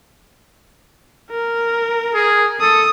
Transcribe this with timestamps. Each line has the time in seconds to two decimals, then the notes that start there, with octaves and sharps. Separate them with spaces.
1.31 A#4
2.14 G#4
2.60 A4 D#6